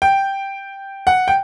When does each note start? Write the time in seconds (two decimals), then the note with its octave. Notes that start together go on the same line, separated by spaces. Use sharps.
0.02 G5
1.07 F#5
1.28 G5